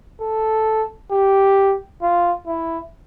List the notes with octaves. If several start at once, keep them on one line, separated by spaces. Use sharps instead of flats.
A4
G4
F4
E4